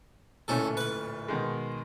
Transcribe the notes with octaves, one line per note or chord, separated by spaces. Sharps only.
D1 A#2 A3 C#4 E4 A4
B4 B5
B2 D#3 G#3